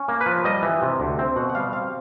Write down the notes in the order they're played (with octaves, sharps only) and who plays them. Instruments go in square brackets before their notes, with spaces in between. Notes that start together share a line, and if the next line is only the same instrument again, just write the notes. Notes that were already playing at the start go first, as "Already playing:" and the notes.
Already playing: [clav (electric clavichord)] C#4
A#3
B4
F3
G3 D#5
E3
C3
D2
C4
B2 F#5
F#5
G3 F5
C4 F5